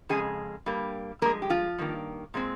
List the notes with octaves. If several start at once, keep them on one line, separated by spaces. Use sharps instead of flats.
F2 C#3 G#3 G#4 G#5
G2 G3 A#3
G2 F3 G#3 A#3 A#4
G4
F3 F4
G2 D#3 A#3
A#2 G#3 C4